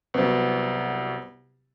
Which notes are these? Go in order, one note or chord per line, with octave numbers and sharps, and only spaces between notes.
C2 F#3 B3 C4